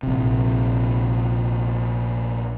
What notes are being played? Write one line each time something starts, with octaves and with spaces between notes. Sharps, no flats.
A#1 C3